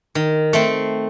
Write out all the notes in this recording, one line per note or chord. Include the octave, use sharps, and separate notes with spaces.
D#3
A3 C4